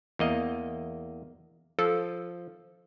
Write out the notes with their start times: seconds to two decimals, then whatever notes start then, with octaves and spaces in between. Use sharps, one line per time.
0.19 E2 A#3 D#5
1.79 F3 A4